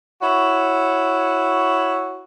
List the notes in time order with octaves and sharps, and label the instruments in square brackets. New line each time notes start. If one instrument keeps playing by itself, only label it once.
[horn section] E4 F#4 C#5